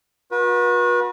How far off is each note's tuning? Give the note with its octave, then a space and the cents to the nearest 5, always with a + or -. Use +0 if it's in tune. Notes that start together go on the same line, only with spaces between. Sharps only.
F#4 -40 B4 -40